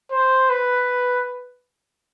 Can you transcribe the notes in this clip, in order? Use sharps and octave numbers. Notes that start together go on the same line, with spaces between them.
C5
B4